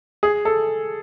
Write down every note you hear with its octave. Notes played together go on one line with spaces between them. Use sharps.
G#4
A4